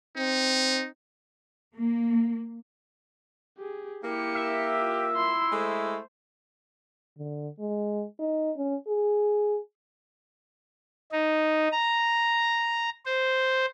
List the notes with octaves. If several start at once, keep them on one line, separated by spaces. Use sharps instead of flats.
C4 D#4
A#3
G4 G#4
A#3 E4 G4 C#7
E5
F4
E4 C6
G#3 A3 C5
D3
G#3
D#4
C#4
G#4
D#4
A#5
C5